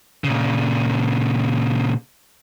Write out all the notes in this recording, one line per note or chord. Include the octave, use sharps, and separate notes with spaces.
A#2 C#3